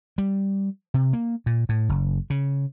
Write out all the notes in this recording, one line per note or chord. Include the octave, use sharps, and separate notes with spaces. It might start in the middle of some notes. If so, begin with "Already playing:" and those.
G3
C3
A#3
A#2
A2
F#1
C#3